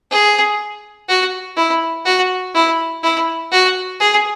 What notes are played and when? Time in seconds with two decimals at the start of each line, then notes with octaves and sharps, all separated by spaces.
0.11 G#4
1.09 F#4
1.57 E4
2.05 F#4
2.55 E4
3.03 E4
3.52 F#4
4.00 G#4